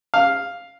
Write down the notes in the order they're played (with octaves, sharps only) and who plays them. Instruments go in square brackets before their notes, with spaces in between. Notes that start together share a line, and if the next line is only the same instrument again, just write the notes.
[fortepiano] F5